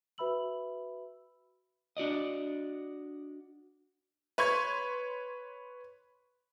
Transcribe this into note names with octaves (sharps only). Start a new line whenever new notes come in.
F#4 B4 E5 B5 E6 F#7
D4 F#4 D5 D#5
B4 C#5 C6 C#6 G#6